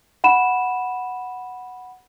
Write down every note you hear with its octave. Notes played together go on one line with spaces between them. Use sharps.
F#5 B5 E7